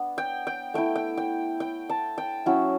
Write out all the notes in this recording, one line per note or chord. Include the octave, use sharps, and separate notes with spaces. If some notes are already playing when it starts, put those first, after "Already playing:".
Already playing: B3 D4
G5
G5
A3 E4 G5
G5
G5
G5
A5
G5
F#3 C#4 E4